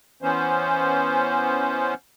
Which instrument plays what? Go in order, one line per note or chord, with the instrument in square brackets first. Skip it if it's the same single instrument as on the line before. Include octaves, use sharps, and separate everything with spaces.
[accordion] E3 B3 C#4 C5